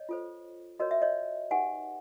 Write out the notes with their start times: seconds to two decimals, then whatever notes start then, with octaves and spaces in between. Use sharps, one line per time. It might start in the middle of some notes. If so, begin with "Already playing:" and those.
Already playing: C#5 D#5
0.09 F4 A4 C5
0.79 F#4 A#4 C#5 D#5
0.91 E5
1.02 C#5 D#5
1.51 D#4 G4 B4 F#5 G#5